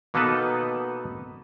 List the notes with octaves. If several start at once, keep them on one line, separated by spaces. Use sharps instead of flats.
B2 A#3 B3 D#4 A4 B4